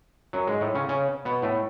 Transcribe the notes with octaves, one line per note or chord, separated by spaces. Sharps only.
F#2 F#3
G#2 G#3
A2 A3
C#3 C#4
C#3 C#4
B2 B3
A2 A3